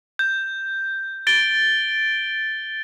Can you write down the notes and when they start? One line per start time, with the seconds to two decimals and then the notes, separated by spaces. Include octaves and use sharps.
0.19 G6
1.27 A6 D7 G7